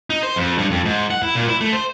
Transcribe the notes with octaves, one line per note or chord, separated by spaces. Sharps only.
D#4
C5
F2
G2
F2
G#2
F#5
E4
A#2
E4
A3
C5